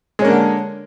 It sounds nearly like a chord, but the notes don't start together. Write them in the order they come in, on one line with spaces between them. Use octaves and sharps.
G#3 C#4 A#3 D4 D3